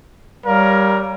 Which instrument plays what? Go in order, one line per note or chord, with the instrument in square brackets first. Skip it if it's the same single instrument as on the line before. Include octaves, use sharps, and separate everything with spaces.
[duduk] G3 [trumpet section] A#4 C#5 F5